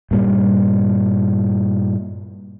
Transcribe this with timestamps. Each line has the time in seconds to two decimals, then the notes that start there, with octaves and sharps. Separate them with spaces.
0.11 G2 A#2 G3